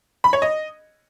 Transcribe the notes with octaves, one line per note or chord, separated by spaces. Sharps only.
B5
C#5
D#5